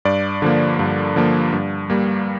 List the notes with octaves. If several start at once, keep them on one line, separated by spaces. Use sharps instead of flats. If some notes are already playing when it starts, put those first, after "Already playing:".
G2 D5
D3 F3 A#3
G2
D3 F3 A#3
G2
G3 A#3